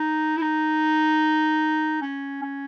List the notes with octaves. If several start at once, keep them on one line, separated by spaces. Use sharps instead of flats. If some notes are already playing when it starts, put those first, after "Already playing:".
Already playing: D#4
E4
D#4
C#4
C#4